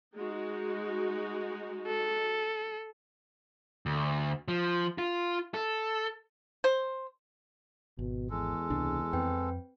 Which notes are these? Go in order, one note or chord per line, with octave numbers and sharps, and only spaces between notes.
G#3 D#4 F#4
A4
D2
F3
F4
A4
C5
G#1 B2
E2 G#3 A4
C#2 C3 D4
F2 C4 B4 G5